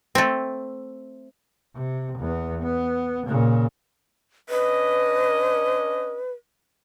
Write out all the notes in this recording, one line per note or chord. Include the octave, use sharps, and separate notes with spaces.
A3 C4
C3
E2 B3
B3
A#2 C#3
C#4 D4 B4 D#5